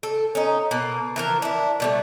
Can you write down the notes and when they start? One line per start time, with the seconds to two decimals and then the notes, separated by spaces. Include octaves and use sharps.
0.03 A4
0.35 C#4 D#4
0.71 B2 A#3
1.16 E3 F3 A#4
1.42 D4 E4
1.80 B2 G3 A3